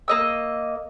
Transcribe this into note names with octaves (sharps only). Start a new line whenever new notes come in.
A#3 D#5 E6